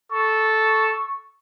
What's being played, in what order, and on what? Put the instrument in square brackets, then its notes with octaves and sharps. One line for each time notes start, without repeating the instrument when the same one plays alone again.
[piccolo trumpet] A4 [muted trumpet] C#6